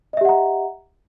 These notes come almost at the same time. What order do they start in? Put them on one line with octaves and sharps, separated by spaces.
D#5 E5 G4 F#5 A#5